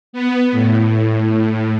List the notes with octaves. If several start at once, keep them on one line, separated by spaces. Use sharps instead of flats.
B3
A2